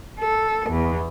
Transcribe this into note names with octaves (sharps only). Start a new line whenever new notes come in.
A4
E2